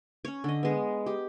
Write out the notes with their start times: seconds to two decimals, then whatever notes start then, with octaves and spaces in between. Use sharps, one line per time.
0.25 C#4 C#5
0.44 D3 D#5
0.63 G#3 B3
1.06 G4